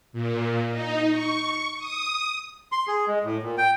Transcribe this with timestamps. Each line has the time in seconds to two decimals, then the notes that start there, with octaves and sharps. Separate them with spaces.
0.13 A#2
0.71 D#4
1.10 C#6
1.78 D#6
2.72 C6
2.88 G#4
3.07 G#3
3.24 A2
3.43 A#2
3.58 G5